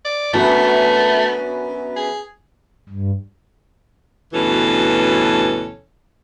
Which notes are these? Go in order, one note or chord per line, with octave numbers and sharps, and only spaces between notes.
D5
F#2 A3 B3 D4 F#4 E5
G#4
G2
D2 G2 B2 E3 C#4 A4